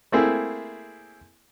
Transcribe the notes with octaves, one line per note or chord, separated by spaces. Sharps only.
A3 A#3 C4 E4 G#4